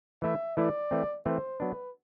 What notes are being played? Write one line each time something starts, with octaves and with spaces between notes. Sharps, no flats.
E3 A3 E4 E5
E3 A3 E4 D5
E3 A3 C4
E3 A3 C4 C5
F#3 B3 D4 B4